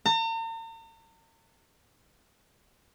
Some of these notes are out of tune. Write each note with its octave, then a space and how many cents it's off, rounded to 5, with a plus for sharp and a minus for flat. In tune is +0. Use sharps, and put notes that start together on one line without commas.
A#5 -45